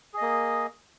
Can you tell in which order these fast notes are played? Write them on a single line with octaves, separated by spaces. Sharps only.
G#4 D#5 A#3